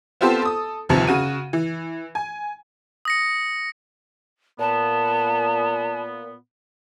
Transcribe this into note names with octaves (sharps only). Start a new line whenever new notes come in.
B3 C4 F4 G4 A4 C5
A4 D#6
G1 D#2 C3 F3
C#3 F#4 D#7
E3
G#5
D#6 A#6 C#7
A#2 B3 A5